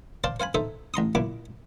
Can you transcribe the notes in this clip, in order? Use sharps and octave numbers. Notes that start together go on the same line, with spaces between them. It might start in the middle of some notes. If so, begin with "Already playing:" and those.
C5 D5 F5 A5 C6
C5 F5 G#5 B5
D#4 A4 C5 E5
A1 A#5 C6 D#6
F#2 A#2 E4 D6